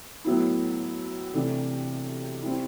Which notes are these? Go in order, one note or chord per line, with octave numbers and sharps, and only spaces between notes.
A2 F#3 B3 E4
C3 E3 A3 D4 G4
G3 C4 E4